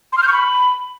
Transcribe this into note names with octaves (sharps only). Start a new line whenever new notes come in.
C6
F6
G6
C#6
B5